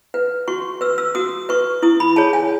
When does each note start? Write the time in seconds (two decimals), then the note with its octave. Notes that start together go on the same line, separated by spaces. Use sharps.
0.14 B4
0.48 F#4 C#6
0.81 B4 E6
0.98 E6
1.15 F#4 D#6
1.49 B4 C#6
1.82 E4 D#6
2.00 B5
2.16 G#4 C#5 A5
2.33 G#5